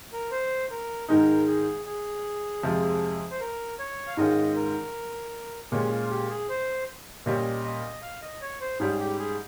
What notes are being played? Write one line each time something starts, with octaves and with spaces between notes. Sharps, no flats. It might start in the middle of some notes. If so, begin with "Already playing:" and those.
A#4
C5
A#4
G#2 D#3 G#3 D#4 A#4
G#4
G#4
F2 C3 F3 G#3
C5
A#4
C#5
F5
G#2 D#3 G#3 C#4 F4 D#5
A#4
A#2 G#3 C#4 G4
F4
G4
G#4
C5
A#2 G3 C#4 D#5
D#5
F5
D#5
C#5
C5
G#2 G3 C#4 G#4
G4
G#4